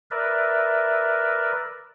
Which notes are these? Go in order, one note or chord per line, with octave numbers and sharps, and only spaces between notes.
A#4 B4 D5 E5